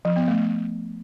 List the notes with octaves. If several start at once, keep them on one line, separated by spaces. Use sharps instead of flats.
F3
B3
A3